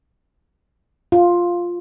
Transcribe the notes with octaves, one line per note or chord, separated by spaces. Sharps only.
F4